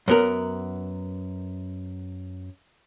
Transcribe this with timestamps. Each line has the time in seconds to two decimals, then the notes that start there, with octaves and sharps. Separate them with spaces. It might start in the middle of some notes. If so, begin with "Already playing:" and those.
0.08 F#2 B3 A#4